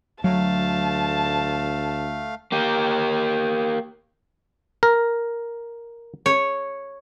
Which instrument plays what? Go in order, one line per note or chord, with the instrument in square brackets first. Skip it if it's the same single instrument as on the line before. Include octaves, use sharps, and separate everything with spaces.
[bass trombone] D2 [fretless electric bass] F#3 [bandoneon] A3 F5 [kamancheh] A5
[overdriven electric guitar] A#3 G4
[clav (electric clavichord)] A#4
[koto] C#5